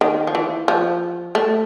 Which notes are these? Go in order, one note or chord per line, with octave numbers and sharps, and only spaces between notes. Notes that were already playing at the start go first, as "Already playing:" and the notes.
D#3
F3
E3
F3
A3